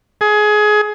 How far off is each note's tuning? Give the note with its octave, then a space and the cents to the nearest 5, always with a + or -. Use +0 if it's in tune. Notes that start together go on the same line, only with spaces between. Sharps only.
G#4 +20